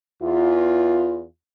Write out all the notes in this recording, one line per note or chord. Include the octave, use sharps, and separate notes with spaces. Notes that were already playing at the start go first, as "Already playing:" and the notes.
E2 F4